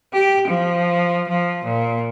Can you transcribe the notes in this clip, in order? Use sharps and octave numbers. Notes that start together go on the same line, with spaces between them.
G4
F3
F3
A#2